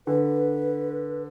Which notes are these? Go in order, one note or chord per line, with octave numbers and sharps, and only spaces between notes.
D3 B4